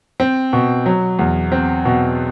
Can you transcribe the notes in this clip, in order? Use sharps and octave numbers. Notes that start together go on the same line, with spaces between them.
C4
B2
F#3
E2
C4
B2